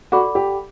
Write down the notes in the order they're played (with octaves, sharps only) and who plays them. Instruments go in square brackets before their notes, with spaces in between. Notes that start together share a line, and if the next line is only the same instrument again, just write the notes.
[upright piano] F#4 [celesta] A4 D5 F#5 B5 D6
[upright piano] G4